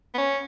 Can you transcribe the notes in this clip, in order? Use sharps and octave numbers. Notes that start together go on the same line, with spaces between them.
B3
C#4